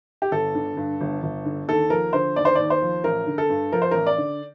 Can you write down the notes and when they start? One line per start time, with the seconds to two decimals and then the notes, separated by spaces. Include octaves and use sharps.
0.22 G4
0.31 G1 A4
0.55 D3
0.77 G2
1.01 G1
1.23 G1
1.45 D3
1.68 D#2 A4
1.90 F3 A#4
2.13 D3 C5
2.36 D#2 D5
2.45 C5
2.55 D#2 D5
2.70 C5
2.82 F3
3.04 A1 A#4
3.27 D3
3.38 A4
3.50 G2
3.72 F3 A#4
3.82 C5
3.91 A1 A#4
4.07 D5
4.18 D3